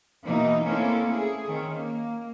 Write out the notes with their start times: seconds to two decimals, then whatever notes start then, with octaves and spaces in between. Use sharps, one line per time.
0.25 B2 E3 A#3 D#4
0.63 A3 A#3 C4 C#4 E4 A4
1.07 A3 E4 G#4
1.46 D#3 C4 C#4
1.75 A#3